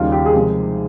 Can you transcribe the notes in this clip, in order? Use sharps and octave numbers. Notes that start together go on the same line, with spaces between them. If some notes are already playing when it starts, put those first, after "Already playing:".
Already playing: D#2 C#3 G3 F4
G4
G#4
C3 F3 G#3